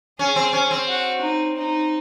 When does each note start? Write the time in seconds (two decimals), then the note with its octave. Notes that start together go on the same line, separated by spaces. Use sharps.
0.19 C#4 G#4
0.36 C4
0.53 C#4
0.71 C4
0.88 F#4
1.21 D#4
1.56 D#4